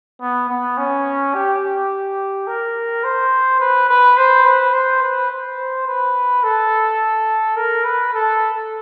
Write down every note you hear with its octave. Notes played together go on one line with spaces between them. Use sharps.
B3
B3
C#4
G4
A#4
C5
B4
B4
C5
B4
C5
B4
C5
B4
A4
A#4
B4
A4